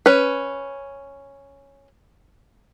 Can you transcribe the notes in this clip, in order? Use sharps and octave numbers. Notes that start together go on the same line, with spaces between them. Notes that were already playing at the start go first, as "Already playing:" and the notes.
C#4 B4